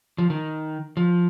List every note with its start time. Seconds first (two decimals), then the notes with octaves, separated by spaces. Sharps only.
0.18 F3
0.30 D#3
0.97 F3